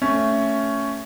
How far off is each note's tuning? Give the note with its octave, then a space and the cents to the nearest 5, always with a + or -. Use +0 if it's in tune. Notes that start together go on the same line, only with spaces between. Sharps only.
A3 +10 C#4 +5